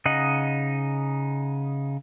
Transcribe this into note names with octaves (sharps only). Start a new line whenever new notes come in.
C#3 D#4 D#5 F#5